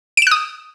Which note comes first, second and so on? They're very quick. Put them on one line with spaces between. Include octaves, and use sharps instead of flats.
D7 E7 F#6 D#6